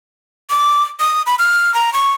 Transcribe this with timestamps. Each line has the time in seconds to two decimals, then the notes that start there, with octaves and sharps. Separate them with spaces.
0.50 D6
1.00 D#6
1.26 B5
1.39 F6
1.74 A#5
1.93 C#6